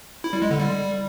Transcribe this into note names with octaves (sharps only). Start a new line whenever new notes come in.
E4
G3
G#3
D3
G3